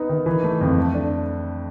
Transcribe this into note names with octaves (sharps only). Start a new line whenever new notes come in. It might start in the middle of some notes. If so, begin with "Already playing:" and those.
Already playing: B3 D#4
D#3
E3
A3
F2
A3
D4